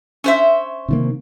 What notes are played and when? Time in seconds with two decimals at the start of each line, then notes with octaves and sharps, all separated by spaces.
0.24 C#4 C5 E5
0.89 C3 D#3 A#3